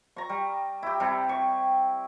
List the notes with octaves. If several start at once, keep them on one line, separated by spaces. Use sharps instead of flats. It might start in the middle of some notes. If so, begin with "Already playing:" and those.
A#5 C#6
G3
E4 G4
C3 G3 E4
C#6